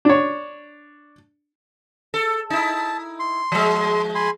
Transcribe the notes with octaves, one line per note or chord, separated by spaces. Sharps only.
D4 C#5
A4
D#4 E4 A5
C6
F3 G#3
G#5 B5 C6